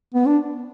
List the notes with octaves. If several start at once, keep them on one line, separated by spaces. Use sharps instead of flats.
B3
D4